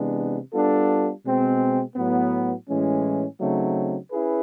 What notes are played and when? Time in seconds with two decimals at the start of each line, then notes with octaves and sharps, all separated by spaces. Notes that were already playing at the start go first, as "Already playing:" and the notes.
Already playing: C3 E3 G#3 B3 D4
0.53 G3 B3 D4 F4 A4
1.24 B2 G#3 C4
1.96 A2 F#3 B3
2.68 A2 E3 G#3 C#4
3.39 C#3 F#3 A3 C4 D#4
4.12 C#4 E4 G#4 B4